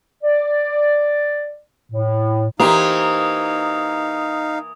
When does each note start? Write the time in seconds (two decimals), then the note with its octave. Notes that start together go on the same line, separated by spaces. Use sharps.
0.24 D5
1.92 A2
2.60 E3 A#3 D#4 G4 C5 F5 D#6